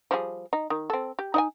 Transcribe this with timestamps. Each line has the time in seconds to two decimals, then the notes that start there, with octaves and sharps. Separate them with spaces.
0.11 F3 G3 G#4
0.53 D#4
0.70 D#3
0.90 C4 A4
1.19 G4
1.34 D#4 D#5 G#5